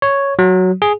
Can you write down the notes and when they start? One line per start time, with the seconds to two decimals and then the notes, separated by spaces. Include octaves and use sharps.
0.02 C#5
0.39 F#3
0.82 G#4